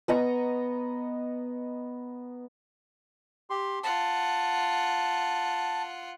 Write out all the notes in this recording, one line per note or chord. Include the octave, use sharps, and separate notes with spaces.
B3 D#5 A#5 C#6
G4 C6
F4 F#5 A5